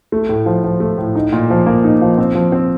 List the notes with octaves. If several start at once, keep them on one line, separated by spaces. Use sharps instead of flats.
A3
A2
F3
F3
A3
A2
D#4
A#2
F3
A#3
D#4
F3
C4
F3
C4